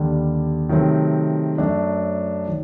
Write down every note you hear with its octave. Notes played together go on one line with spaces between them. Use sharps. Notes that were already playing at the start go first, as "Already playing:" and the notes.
Already playing: D#2 D3 G3 D4
C3 D#3 F#3 A3 C4
F#2 F#3 A3 D4
D#3 F#3